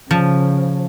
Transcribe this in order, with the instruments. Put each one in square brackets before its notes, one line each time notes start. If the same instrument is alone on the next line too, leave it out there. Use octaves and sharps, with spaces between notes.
[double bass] C#3 [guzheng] F3